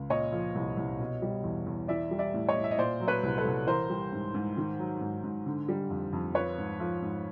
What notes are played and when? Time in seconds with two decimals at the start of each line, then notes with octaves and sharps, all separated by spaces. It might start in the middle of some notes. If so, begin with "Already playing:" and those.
Already playing: C#2
0.10 A#2 C#5 D#5
0.32 F3
0.55 C2
0.77 C2
0.99 B2
1.22 G3
1.44 E2
1.66 E2
1.88 E3 D5 E5
2.11 G3
2.19 D5 E5
2.34 A2
2.48 C#5 D#5
2.56 A2
2.64 E5
2.71 D#5
2.78 A#2 C5 D5
3.00 F#3
3.08 B4 C#5
3.23 C2
3.38 A4 B4
3.45 C2
3.67 E3 A#4 C5
3.90 G3
4.12 G#2
4.34 G#2
4.57 D#3
4.79 F#3
5.01 G#2
5.24 G#2
5.46 D3
5.68 G3
5.90 F2
6.13 F2
6.35 F3 B4 C#5
6.58 G#2
6.80 F3
7.02 G#2